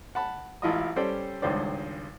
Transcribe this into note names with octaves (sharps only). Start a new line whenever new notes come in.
F#5 A5 B5
A1 E4 F4 D#5 A5 D#6
G3 C#4 A4 C5 D5 G5
G#1 C#2 G2 C5 D5